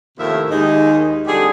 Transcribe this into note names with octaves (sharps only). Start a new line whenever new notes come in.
D#2 A2 C3 F3 A#4 E5
D#2 G#3 D#4
F2 D3 G3 G4 G#4